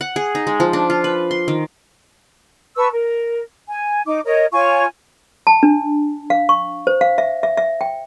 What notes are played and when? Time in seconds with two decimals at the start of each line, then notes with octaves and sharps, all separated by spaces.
0.01 F#5
0.16 G#4
0.35 D#4
0.47 G#3
0.60 F3
0.73 D4
0.90 F4
1.04 B4
1.31 C6
1.48 D#3
2.76 B4 A5 C#6 E6
2.92 A#4
3.67 G#5
4.05 D#4 D6
4.24 A#4 C#5 D#5
4.52 F4 C#5 G#5 C#6
5.47 A5
5.63 D4
6.30 F5
6.49 C#6
6.87 C5
7.01 F5
7.18 E5
7.43 E5
7.58 E5
7.81 G5